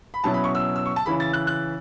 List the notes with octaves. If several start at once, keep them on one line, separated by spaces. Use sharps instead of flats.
B5
B2 F#3 C#4 E4 A5
B5
C#6
E6
E6
C#6
A5
C#3 E3 C#4 E4 B5
A6
F#6
F#6